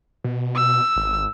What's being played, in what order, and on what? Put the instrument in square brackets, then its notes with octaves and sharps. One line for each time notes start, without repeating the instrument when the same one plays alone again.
[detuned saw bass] B2
[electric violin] E6
[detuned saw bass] G#1